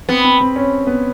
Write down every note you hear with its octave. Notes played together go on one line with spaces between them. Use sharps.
B3 C4
C4
C4
C#4
B3